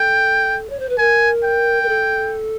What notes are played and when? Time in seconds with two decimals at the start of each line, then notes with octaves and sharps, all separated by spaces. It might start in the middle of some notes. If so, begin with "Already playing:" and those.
Already playing: A4 G5
0.69 C#5
0.79 C5
0.89 B4
0.98 A#4 G#5
1.43 G5
1.82 A#4
1.88 A4